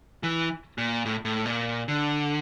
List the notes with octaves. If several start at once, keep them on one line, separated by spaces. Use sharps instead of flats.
E3
A#2
A2
A2
A#2
D3